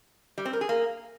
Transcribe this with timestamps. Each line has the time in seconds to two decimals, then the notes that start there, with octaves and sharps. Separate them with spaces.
0.38 G3
0.45 C4
0.53 A#4
0.61 G#4
0.69 A#3